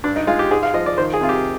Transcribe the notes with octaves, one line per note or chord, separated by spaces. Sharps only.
G2 D4
D#4
G#3 F4
G4
G#2 G#4
F5
F3 D#5
D5
D#3 C5
G#4
C3 F4
G4